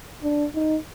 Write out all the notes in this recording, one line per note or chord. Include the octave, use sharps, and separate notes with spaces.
D4
D#4